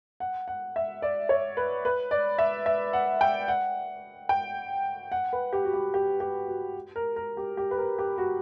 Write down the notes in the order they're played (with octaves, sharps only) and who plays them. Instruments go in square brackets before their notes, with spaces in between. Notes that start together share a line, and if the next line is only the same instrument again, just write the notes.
[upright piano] F#5
F#5
E5
D5
C#5
B4
B4
D5
E5
E5
F#5
G5
F#5
G5
F#5
B4
G4
F#4
G4
G4
G4
F#4
A#4
A#4
G4
G4
B4
A#4
G4
F#4